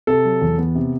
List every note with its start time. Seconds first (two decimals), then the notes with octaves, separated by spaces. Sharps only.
0.07 C3 A4
0.25 F#3
0.41 E2
0.58 B3
0.75 C3